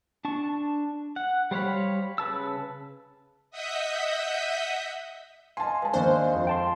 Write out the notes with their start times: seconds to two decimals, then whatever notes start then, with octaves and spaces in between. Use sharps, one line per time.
0.25 D4 A5 C#6
1.16 F#5
1.51 G3 C5 C#5 F5 B5
2.18 C#3 B4 A5 E6
3.50 D#5 E5 F#5 D#6 G6 B6
5.57 D#5 F5 G#5 A5 C6
5.82 G#3 B4 A5
5.93 D#2 D4 C5 F5 C#6
6.33 F2
6.47 G5 A5 C6